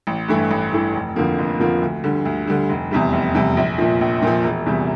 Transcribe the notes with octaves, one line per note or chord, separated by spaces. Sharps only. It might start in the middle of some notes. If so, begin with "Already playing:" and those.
A1
G2 E3 A3 E4
A1
G2 E3 A3 E4
F1
F2 D3 F3 A#3
F1
F2 D3 F3 A#3
D2
D3 G3
D2
D3 G3
F1
E2 C3 G3
F1
E2 C3 G3
A#1
A#2 F3
A#1
A#2 F3
E1
E2 C3 G3